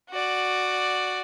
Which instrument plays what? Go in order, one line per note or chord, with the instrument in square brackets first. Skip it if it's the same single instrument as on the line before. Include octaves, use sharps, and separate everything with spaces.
[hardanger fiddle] F#4 D5